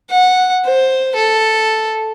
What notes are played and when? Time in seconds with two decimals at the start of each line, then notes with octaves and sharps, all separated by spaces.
0.10 F#5
0.65 C5
1.15 A4